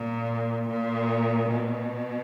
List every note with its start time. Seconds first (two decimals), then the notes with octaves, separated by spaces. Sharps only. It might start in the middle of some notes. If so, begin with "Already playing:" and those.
Already playing: A#2
0.69 A#2
1.49 B2